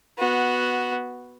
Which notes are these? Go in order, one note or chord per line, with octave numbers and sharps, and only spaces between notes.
B3 F#4